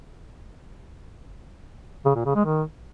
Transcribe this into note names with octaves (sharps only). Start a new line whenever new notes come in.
C#3
A#2
C#3
G#3
D#3